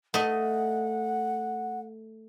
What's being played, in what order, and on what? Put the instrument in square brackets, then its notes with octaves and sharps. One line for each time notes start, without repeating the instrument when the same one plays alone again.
[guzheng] A3 D#5 [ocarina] F#5